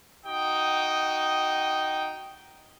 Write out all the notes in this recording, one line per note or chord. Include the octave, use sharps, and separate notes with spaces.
D#4 F#4 G5 D#6